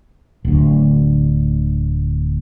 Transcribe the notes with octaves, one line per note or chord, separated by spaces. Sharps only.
D1 D2